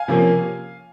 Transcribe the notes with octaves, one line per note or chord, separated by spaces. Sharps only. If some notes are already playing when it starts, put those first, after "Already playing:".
Already playing: F5 G#5
C3 F3 A#3 C#4